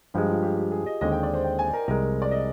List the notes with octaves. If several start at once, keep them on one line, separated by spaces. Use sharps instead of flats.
G2 F3 G#3 G4
F4
G4
G4
G#4
D#5
D#2 D3 G#3 C4 D#5
G5
D5
C5
G5
G#5
A#4
C2 C3 F3 G#3 A#4
D5
D#5